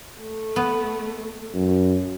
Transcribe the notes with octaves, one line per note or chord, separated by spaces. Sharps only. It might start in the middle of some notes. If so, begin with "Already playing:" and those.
A3
B3
F#2